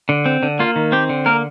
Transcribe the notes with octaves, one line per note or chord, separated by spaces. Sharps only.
D3
C4
D3
A#3 F4
D#3
C4 G4
D3
A#3 A#4